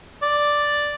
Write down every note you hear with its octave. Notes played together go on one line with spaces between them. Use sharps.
D5